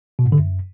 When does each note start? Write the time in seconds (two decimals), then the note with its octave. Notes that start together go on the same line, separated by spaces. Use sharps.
0.19 B2
0.26 G#2
0.32 D3
0.39 F#2